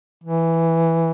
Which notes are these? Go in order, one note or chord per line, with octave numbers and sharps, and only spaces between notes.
E3